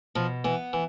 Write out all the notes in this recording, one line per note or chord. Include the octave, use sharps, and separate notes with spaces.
B2 F3
E3 B3
E3